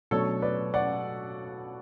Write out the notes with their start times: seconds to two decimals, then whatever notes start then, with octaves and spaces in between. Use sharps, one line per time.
0.11 B2 F#3 A3 D4 A4 C#5
0.42 B4 D5
0.74 D5 F#5